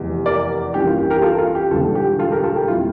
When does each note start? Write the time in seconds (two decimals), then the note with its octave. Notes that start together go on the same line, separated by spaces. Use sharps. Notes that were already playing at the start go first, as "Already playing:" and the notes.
Already playing: F1 E2 C3
0.26 A#4 D5
0.74 A1 G2 E3 A#3 G4
0.87 F4
0.98 G4
1.10 G4 A#4
1.22 F4 A4
1.38 F4
1.55 G4
1.71 E1 E2 D3 G3 F4 A4
1.95 G4
2.19 F4 A4
2.32 G4 A#4
2.43 F4 A4
2.56 G4
2.68 A#2 G3 C4 E4 F4